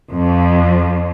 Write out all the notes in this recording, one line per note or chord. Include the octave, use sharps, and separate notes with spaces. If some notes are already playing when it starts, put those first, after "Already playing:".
F2